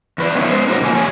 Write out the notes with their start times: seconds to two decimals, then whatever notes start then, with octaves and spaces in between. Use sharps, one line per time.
0.18 E2 B4 D5
0.35 F2 B3 C#4 D#4 E4
0.50 G#3 B3 C5
0.67 C#4 D#4 F#4 G4 A#4 C#5
0.81 F#2 B2 F3 A#3 G#5
0.95 E2 G3 C#5 G#5